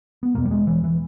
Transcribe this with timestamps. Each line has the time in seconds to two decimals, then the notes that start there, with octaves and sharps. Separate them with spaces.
0.23 B3
0.35 E2 B2 A#3
0.45 G3
0.51 G#3
0.67 E3
0.84 E3